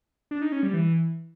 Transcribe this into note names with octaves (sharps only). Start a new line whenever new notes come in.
D4
D#4
C#4
G3
E3